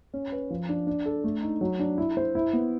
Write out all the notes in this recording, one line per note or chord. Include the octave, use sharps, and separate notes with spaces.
C#4
B4
F3
D4
D4
A4
A3
D#4
F#3
D4
E4
C5
E4
B3